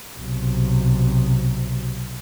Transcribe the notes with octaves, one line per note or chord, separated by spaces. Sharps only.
B1 C3